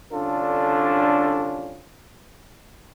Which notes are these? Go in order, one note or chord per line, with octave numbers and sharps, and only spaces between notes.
C2 D3 C#4 D4 F4 A4